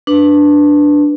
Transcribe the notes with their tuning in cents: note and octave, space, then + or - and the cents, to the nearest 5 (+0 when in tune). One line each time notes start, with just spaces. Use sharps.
D4 +0 B4 +0